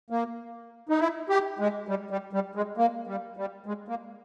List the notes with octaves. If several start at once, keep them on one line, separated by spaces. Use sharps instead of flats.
A#3
D#4
E4
G4
G#3
G3
G3
G3
G#3
A#3
G3
G3
G#3
A#3